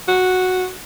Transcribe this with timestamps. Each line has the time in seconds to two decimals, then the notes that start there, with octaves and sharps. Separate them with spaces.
0.08 F#4